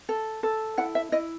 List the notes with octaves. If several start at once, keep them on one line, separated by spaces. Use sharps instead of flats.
A4
A4
E4 F#5
E5
E4 D#5